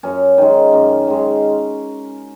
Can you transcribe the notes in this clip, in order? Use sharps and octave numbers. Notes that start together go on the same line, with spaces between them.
F#2 C#4
D#3 G#3
F#2
D#3 G#3